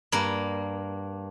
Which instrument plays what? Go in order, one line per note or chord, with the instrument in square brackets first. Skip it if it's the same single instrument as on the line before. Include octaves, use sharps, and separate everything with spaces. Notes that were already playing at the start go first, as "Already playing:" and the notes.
[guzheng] G2 A#3